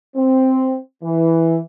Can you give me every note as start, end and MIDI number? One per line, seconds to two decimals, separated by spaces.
0.16 0.76 60
1.02 1.58 52